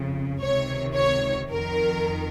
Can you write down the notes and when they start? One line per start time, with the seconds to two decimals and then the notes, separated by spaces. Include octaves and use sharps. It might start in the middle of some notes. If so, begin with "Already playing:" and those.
Already playing: F2 C#3
0.41 C#2 C3 D#3 C#5
0.96 C#5
1.50 F2 D#3 A#4